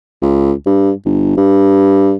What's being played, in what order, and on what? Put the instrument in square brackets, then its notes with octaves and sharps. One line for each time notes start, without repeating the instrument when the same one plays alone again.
[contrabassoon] C#2
G2
G1
G2